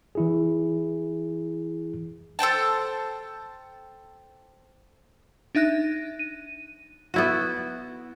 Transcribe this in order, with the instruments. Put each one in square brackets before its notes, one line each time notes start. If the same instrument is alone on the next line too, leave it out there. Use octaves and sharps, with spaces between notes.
[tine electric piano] E3 E4 G#4
[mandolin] A4 C5 G5 A5
[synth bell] D4 D#4 E5 F#6 A#6
D#7
[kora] B3 E4 F#4